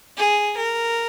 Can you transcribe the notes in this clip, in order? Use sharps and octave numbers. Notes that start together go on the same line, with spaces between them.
G#4
A#4